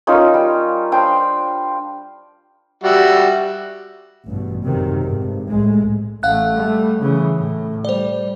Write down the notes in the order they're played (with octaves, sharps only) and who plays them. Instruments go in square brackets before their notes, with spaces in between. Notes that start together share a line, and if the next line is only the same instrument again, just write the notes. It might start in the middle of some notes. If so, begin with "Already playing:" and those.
[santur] C#4 D#4 F4 A#4
G3
D4 C5 G5 A5
[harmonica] G3 F#4 E5
[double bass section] A1 G2 B2
F#2 C3 D#3
G#1 G2
C2 A2 G#3
[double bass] A1 A3 [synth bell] F5 F#5 F#6
[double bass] G3 A3
C#3 E3
A2
[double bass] G3 [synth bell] C5 D5